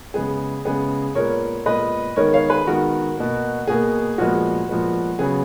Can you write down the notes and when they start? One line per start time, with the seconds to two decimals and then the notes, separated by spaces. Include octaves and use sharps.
0.14 C#3 G#3 B3 G#4
0.65 C#3 G#3 B3 G#4
1.15 A#2 G#3 B3 A#4 C#5
1.66 A#2 G#3 B3 B4 D#5
2.16 D#3 G#3 B3 A#4 C#5
2.33 C#5 F5
2.50 G#4 B4
2.67 D#3 G#3 B3 F#4 A#4
3.17 B2 A#3
3.67 B2 A#3 G#4
4.18 A#2 F3 G#3 B3 F#4
4.69 A#2 F3 G#3 B3
5.19 C#3 F#3 B3 G#4